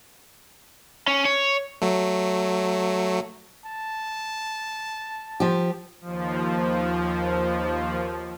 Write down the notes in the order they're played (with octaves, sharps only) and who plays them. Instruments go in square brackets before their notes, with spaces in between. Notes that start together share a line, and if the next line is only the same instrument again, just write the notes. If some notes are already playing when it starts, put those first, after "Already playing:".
[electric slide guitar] C#4
C#5
[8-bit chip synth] F#3 A3
[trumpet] A5
[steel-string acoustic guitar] F3 G4
[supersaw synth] D#2 F3